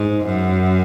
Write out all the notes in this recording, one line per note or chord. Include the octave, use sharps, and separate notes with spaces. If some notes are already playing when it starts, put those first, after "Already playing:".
Already playing: G#2
F#2